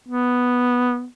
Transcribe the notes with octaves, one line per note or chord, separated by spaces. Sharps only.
B3